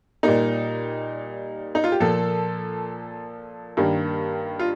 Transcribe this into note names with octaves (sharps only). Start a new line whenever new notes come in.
A#2 G3 A#3 D#4
D#4
F4
G4
A#2 F3 A#3 A4
G2 D#3 G3 A#3
F4